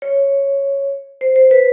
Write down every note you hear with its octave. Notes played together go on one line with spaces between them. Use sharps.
C#5
C5
C5
B4